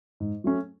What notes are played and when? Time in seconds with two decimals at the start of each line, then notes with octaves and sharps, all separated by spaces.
0.20 G#2
0.44 F#3 A3 C#4